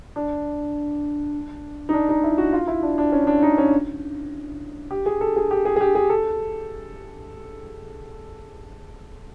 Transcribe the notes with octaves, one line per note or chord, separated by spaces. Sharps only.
D4
D#4
D4
D#4
E4
F#4
F4
E4
D4
D4
C#4
D4
D#4
C#4
G4
G#4
A4
G#4
G4
G#4
G#4
G4
G#4
A4